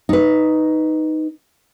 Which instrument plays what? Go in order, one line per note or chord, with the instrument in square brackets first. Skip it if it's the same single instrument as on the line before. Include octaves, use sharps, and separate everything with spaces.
[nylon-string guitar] D#4 B4